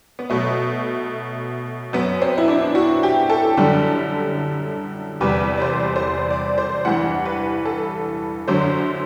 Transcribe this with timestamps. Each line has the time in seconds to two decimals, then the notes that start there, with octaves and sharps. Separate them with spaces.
0.19 B3
0.30 B2 F#3 A3
1.93 F#2 F#3 B3
2.22 C4
2.38 E4
2.48 D4
2.75 F#4
3.03 G4
3.30 A4
3.57 F#2 D3 G3
5.21 E2 C3 G3 B4
5.57 D5
5.62 C5
5.96 C5
6.03 D5
6.30 D5
6.58 C5
6.85 G2 E3 G3 F#5
7.25 B4
7.65 A4
8.48 F#2 D3 F#3 C5